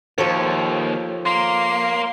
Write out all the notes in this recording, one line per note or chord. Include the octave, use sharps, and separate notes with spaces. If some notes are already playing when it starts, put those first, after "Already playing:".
D#2 F3 A4 C#5
A#3 C6